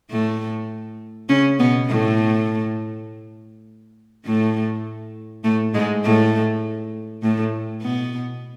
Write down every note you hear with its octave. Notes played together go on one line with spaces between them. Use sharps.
A2 A3
C#3 C#4
B2 B3
A2 A3
A2 A3
A2 A3
G#2 G#3
A2 A3
A2 A3
B2 B3